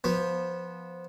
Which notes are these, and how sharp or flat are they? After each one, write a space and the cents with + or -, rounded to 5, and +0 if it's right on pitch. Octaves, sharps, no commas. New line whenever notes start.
F3 +0 B3 -10